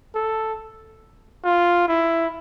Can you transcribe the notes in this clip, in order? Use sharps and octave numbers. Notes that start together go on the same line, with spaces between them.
A4
F4
E4